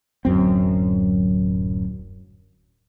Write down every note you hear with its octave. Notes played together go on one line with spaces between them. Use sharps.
D1 F#2 C4